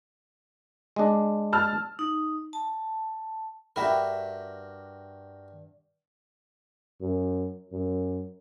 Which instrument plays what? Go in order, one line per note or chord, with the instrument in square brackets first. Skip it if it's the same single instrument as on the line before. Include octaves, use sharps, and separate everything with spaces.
[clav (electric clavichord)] G#3 D4
[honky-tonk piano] A5 E6 F6
[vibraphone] D#4
A5
[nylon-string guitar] G2 E5 [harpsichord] F#4 G4 A#4 [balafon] G5 B5
[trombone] F#2
F#2